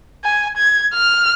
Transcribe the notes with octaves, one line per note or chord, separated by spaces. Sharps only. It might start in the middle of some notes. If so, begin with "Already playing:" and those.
G#5
G#6
F6